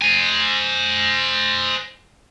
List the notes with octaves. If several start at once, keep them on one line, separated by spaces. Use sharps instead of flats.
C5 G#5